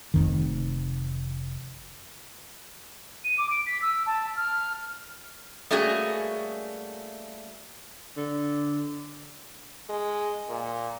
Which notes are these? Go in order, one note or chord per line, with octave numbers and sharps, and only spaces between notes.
F1 F2 D#3
D#7
D6
D7
B6
E6
A5
F6
G3 A3 A#3 C#4 F#4 G#4
D3
G#3
A#2